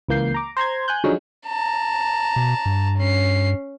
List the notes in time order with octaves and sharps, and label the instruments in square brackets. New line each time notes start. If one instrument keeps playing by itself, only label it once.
[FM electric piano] C#2 E3 A#3 G6 C7
A#5 D6
C5 A#5 C6 G#6
G#5 F#6 G6
D3 F3 F#3 G#3 C#4 D#4
[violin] A5 A#5
[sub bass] B2
G2
[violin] C#4 C7